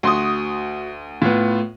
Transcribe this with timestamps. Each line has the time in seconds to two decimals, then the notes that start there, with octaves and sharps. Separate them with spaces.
0.03 D2 F#4 C6 D#6
1.22 A2 B3 F4